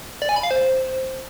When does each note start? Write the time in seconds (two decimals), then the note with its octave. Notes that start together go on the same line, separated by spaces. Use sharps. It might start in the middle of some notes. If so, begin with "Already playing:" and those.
0.22 D5
0.29 G#5
0.36 B5
0.43 F5
0.51 C5